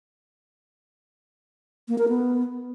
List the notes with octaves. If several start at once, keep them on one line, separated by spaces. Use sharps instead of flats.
A#3
A#4
B3